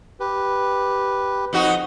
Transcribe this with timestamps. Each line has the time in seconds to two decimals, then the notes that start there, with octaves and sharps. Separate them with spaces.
0.20 G4 B4
1.53 F2 D#4 F#4